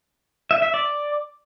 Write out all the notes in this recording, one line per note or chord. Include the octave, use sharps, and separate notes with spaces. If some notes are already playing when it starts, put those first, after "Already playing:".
E5
E5
D5